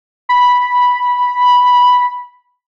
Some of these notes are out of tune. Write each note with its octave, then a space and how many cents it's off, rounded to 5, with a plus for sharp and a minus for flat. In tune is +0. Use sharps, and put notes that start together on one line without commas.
B5 -5